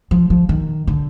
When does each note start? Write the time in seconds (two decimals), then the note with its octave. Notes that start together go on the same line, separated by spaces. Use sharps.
0.11 F3
0.30 F3
0.49 D#3
0.87 D3